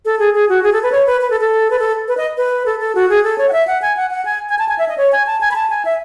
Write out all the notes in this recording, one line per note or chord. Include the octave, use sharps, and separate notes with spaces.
A4
G#4
G#4
F#4
G#4
A4
B4
C#5
B4
B4
A4
A4
B4
A4
B4
D#5
B4
A4
A4
F#4
G#4
A4
C#5
F#5
E5
F#5
G#5
F#5
F#5
G#5
G#5
A5
G#5
E5
D#5
C#5
G#5
A5
G#5
B5
A5
G#5
E5